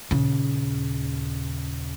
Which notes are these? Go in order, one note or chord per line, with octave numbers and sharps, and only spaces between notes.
D#1 C#3